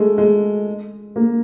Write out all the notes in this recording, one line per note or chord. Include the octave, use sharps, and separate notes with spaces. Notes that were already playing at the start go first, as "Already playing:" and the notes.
Already playing: G#3 A3
G#3
A#3